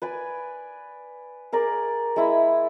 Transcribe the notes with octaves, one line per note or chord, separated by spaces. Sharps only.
B4 D5 G#5
G#4 A#4 D5
G#3 E4 B5